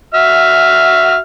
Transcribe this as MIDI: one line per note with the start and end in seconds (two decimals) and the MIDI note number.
0.14 1.18 66
0.14 1.18 76
0.14 1.18 89